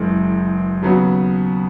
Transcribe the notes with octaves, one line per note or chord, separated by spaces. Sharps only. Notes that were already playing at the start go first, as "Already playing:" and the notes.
Already playing: F#1 F#2 E3 G#3
D#2 C#3 F#3 B3 F#4